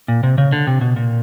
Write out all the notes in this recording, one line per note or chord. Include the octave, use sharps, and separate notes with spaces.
A#2
C3
C#3
D3
C3
B2
A#2